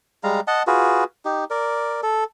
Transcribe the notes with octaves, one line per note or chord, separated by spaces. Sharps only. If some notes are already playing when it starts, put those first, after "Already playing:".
G3 G#3 F5 A#5
D#5 F#5 A5
F4 F#4 G#4 B4
D#4 G4
A#4 D5
A4